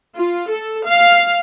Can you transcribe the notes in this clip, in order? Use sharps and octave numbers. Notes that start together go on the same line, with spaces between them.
F4
A4
F5